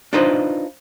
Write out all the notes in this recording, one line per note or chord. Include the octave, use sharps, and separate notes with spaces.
D4 D#4 F4 B4 C5 D#5